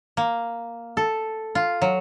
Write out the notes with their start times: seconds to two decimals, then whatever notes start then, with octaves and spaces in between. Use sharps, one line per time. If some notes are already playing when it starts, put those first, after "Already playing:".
0.17 A#3
0.97 A4
1.55 F4
1.82 F#3